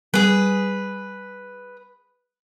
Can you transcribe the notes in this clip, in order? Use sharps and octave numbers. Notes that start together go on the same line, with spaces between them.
G3 G#4 B4